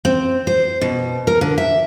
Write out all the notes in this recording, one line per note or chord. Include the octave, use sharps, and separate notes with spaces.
C4
C5
B2
A#4
D3
E5